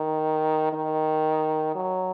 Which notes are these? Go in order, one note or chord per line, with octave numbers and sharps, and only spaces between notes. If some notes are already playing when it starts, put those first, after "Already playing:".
Already playing: D#3
D#3
F#3